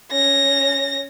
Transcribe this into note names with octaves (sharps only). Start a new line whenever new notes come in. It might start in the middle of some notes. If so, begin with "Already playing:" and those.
C#4 A#6